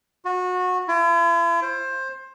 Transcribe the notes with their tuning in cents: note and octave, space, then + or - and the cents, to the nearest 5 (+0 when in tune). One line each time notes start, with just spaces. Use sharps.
F#4 -25
E4 +45
C5 +20